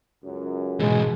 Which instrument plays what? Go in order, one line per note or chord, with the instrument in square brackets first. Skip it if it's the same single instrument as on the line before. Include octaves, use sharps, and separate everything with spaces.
[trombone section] C#2 F#2
[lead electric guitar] G#2 E3 [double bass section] B2 [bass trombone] G#3